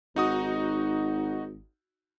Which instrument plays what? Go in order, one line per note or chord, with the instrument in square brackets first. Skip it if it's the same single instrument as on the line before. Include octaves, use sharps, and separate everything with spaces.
[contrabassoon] G#1 [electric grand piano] D#4 F#4 D#6